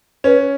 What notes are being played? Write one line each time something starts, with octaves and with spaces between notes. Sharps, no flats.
C#4 B4